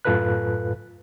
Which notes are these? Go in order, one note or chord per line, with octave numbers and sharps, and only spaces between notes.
F#2 A2 F4 A4 B4 F#6